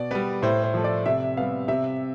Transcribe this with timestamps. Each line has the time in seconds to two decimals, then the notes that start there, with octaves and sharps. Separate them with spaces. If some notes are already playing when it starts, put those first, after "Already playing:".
Already playing: B2 D5
0.11 G3 B3 B4
0.42 A2 C5
0.63 C5
0.74 F3 A3
0.84 D5
1.06 C3 E5
1.37 G3 B3 F5
1.68 C3 E5